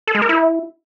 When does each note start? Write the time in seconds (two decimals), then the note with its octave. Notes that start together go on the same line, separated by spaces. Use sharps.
0.07 A4
0.15 G#3
0.22 A#4
0.29 E4